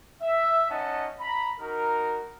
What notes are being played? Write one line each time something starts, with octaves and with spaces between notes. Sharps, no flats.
E5
C#4 D#4 D#5 F#5 A5
A#5 B5
D#4 F#4 A#4